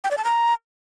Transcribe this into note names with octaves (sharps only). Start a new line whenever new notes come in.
G5
D5
A5
A#5